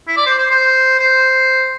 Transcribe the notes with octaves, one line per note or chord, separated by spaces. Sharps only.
E4
D5
C5
C5
C5
C5